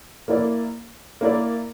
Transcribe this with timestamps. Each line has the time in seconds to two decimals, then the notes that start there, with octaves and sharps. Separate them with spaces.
0.28 A#3 E4 A#4 D5
1.21 A#3 E4 A#4 D5